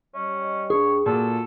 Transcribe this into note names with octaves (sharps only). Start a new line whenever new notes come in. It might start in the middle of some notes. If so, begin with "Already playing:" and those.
G3 C#4 C#5 D#5
G2 D4 G#4 C#5
A#2 F4 F#4 A4